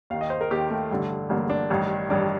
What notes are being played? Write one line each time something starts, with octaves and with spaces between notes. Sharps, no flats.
D#2 D#3 F5
D#5
C5
A#4
D#2 D#3 G4
A3
A1 G2 D3
A1 G2 D3 A#3
D4
A1 G2 D#3
A1 G2 D#3 D4